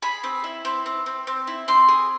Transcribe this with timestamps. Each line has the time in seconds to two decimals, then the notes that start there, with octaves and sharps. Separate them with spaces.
0.02 G#4 B5
0.24 C4
0.44 E4
0.65 C4
0.86 C4
1.06 C4
1.27 C4
1.47 E4
1.68 C4 C6
1.88 G#4